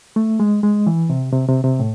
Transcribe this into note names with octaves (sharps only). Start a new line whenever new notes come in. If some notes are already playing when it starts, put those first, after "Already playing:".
A3
G#3
G#3
E3
C3
C3
C3
C3
A2